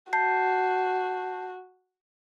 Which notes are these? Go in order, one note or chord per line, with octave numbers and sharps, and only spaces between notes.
F#4 A5 G6 C7